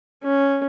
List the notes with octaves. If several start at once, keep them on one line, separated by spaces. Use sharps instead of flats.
C#4